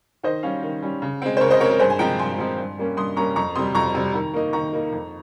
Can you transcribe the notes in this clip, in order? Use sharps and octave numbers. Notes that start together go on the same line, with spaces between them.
D#3 C5 D#5
G3 C#4 C#5 F5
D#3
G3 C#4
C#3
G#3 C4
C5
C#3 A#4 C#5
C5 D#5
G#3 C4 A#4 C#5
A#4
G2 G#4 C5
G#5
F3 G#3 C4 G5 A#5
G2 G#5 C6
F3 G#3 C4
G2
G3 A#3 C#4
G2 C6 D#6
G3 A#3 C#4 A#5 C#6
F2 A#5 C#6
C3 G3 C6 D#6
F2 A#5 C#6
C3 G3
D#3
A#3 D#4
D#3 A#5 C#6
A#3 D#4
F2